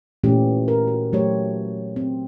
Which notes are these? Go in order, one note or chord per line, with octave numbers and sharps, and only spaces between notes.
A#2 E3 A3 C#4 G4
A#4
F#4
E3 F#3 A3 G4 C5 C#5
C4